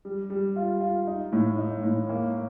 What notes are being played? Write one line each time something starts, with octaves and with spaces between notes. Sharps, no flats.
G3
G3
F4
F4
D#4
A2
D#4
A2
A#3